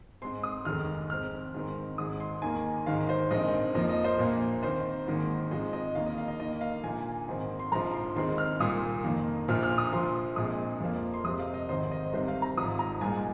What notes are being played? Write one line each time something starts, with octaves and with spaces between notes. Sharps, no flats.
G#2 G#3 C4 C6
D#6
F1 D#2 D#3 G#3 F6
G#2 G#3 C4 F6
G#2 D#3 C4
G#1 G#2 G#3 D#6
C6
D#2 D#3 A#3 G#5
G#1 G#2 D#3 G#3 F5
C5
A#1 G#2 D#3 C4 D#5
F2 F3 A#3 D#5
D#5
C5
A#1 A#2 A#3
D#2 D#3 C4 C5
G#1 G#2 D#3 A#3
G#2 F3 G#3 C4 D#5
D#5
D#2 D#3 A#3 F5
D#5
F5
D#5
D#2 D#3 A#3 D#5
F5
A#1 A#2 A#3 G#5
G#1 G#2 D#3 C4
C6
A#1 G#2 F3 A#5
C6
D#2 D#3 G#3 C4 C6
F6
C2 A#2 A#3 D#6
F2 D#3 A#3
A#1 A#2 F3 F6
F6
D#6
A#1 A#2 F3 C6
A#1 A#2 G#3 C4 D#6
F2 F3 A#3
C6
F2 C3 G#3 C4 D#6
F5
D#5
G#1 G#2 D#3 C4 C5
D#5
C2 C3 D#3 C4 C5
F5
A#5
G#1 G#2 F3 D#6
A#5
C2 A#2 G#3 G#5